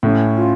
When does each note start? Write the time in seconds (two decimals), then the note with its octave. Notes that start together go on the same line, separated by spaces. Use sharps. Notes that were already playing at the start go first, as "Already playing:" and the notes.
0.03 A2 C#4
0.37 F4